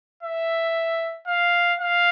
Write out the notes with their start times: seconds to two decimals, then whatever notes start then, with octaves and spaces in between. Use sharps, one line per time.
0.23 E5
1.27 F5
1.80 F5